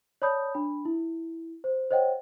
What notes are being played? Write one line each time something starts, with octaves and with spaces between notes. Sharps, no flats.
C#5 D5 A5 B5 D#6 G6
D4 B5
E4
C5
C5 C#5 D#5 F#5 G5